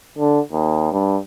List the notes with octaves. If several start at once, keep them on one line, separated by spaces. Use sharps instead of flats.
D3
D#2
G2